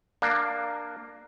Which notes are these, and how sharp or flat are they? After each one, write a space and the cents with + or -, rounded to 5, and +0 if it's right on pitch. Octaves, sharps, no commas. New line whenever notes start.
A#3 +0 D4 +20